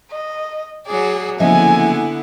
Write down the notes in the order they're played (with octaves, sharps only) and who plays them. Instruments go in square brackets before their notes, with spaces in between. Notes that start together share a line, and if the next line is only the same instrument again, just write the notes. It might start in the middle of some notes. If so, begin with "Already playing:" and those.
[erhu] D#5
[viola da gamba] F#3 D5 [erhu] G#4
[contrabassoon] F#1 [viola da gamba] D3 B3 E4 [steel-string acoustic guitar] F3 D#5 E5 [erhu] G#5